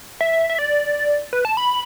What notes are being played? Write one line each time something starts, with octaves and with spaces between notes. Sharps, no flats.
E5
E5
D5
B4
A5
B5